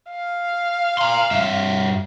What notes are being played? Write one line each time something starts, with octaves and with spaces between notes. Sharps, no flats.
F5
A#5 C6
G2 E5